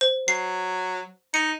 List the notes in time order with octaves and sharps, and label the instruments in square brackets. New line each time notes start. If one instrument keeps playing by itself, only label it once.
[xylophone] C5
[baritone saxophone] F#3 [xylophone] C7
[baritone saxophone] D#4 [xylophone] C#7